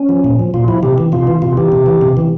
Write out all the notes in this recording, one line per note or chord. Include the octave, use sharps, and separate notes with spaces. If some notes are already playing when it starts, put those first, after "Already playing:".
Already playing: C#4
F3
A#2
F3
A#2 F4
F3 E4
C3 G4
E3
C3 F4
E3
C3 F4
E3 G4
C3
E3
C3
E3